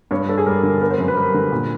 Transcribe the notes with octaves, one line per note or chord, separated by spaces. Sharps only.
G2 C#5
G2 A4
G#4
G3 A#4
D3
A#4
B3 A#4
C5
F#2
B4
G3 A#4
D3
A#2